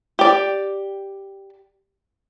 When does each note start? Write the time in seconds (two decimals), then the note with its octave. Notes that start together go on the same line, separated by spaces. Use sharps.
0.19 G4 D5